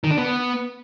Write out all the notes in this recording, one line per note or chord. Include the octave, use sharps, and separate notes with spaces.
D#3
D4
B3